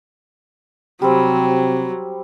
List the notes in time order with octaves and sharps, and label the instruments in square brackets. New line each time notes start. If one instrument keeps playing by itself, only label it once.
[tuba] C3 [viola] F#3 [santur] G3 C4